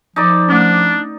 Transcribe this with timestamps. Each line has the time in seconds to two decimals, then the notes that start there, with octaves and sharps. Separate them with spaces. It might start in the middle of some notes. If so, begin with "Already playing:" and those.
0.16 F3 D#4 A#4 D5
0.48 A3 C#4 D4